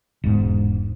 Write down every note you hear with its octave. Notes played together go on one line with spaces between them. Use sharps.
E1 G#2